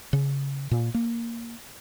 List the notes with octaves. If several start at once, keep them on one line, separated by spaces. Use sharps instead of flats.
C#3
A#2
A#3